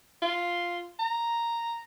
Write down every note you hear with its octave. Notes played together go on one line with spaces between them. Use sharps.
F4
A#5